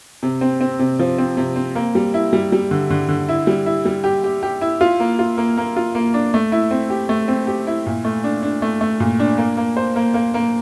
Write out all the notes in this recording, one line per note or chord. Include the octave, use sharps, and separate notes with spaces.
C3
C4
C4
C3
F3
C4
C3
C4
A#3
G3
E4
G3
G3
D3
D3
D3
E4
G3
E4
G3
G4
G4
G4
E4
F4
A#3
F4
A#3
A#3
F4
A#3
D4
A3
E4
C4
G4
A3
C4
G4
E4
A#2
A3
D4
D4
A3
A3
A#2
D4
A#3
A#3
C5
A#3
A#3
A#3